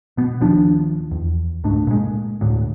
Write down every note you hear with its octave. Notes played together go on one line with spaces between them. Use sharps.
B2 B3
D#1 D#2 F3 D4
E2
C#2 G#2 A3 D4
A#2 G#3
D2 A2